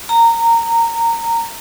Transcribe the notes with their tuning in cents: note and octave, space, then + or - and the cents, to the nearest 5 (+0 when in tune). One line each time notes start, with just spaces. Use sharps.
A#5 -15